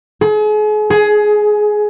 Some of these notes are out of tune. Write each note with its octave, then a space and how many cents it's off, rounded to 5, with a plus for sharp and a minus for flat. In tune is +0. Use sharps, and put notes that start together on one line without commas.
G#4 +40
G#4 +15